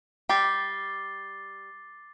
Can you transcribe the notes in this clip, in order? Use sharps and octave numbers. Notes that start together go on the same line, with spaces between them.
G3 G4 D6 A6 C7 G7